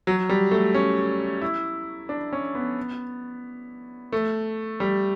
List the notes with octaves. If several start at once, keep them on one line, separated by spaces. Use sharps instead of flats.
F#3
G3
A3
C#4
E4
D4
C#4
B3
A3
G3